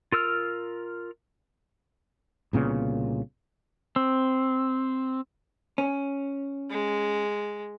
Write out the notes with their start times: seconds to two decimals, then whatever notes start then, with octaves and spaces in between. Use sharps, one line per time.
0.12 F4 A#4 E6 F6
2.53 C2 A#2 C#3 B3
3.96 C4
5.78 C#4
6.70 G#3